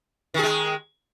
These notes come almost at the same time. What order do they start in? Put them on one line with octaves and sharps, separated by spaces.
D#3 G#4 G#3